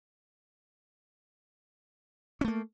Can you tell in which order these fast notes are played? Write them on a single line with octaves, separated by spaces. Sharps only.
C#4 A3 A#3